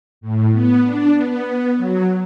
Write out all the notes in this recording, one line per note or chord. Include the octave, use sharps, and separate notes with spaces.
A2
B3
D4
B3
F#3